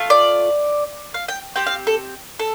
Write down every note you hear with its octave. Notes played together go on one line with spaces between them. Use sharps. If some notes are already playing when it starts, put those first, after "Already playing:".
Already playing: A3 F4
D5
F5
G5
C4 G4 G5
F5
A4
A4